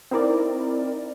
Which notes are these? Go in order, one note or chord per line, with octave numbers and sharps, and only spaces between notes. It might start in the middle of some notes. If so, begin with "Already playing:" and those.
C4 D#4 E4 A#4 D5